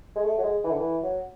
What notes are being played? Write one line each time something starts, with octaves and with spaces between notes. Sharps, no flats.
G#3
A3
F#3
G#3
E3
D3
E3
F#3